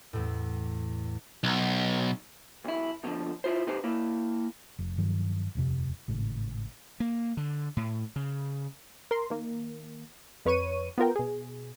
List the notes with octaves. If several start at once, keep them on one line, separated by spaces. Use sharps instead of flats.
E2 A2
B1
B1 E4
F2 B2 D3 F3
E4 F4 C5
C3 D#4 G4 B4 C5
A#3 E4
F1
G2 D#3 F3 F#3
D#1 F2 C3
G#1 A2 C#3
A#3
D3
A2
C#3
A#4 C6
D#3 A#3
F2 B4 C#5 C#6 D#7
B3 F4 A#4 G5
B2 G#4